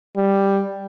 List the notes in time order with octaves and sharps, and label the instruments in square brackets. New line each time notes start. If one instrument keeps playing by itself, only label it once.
[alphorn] G3